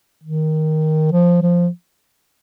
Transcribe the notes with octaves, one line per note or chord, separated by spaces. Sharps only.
D#3
F3
F3